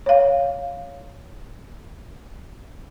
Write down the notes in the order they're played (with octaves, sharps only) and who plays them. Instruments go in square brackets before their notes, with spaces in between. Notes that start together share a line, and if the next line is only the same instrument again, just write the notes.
[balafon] C#5 F5